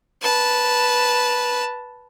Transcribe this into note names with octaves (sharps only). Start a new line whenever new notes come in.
B4 A5